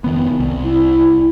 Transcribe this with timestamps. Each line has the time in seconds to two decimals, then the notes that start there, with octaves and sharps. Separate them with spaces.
0.04 F1 D#3 B3
0.40 C2
0.64 E4